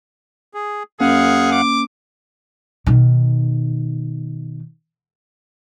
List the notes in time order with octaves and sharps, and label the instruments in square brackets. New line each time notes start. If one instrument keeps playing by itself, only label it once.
[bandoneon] G#4
[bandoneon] F#2 F5 F#5 [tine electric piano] A#3 C#4 [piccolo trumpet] G#4
[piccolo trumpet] D6
[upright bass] B2 D#3